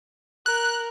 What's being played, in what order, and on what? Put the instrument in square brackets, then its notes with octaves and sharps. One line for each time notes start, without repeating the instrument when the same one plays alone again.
[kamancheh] A#4 [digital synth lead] F#6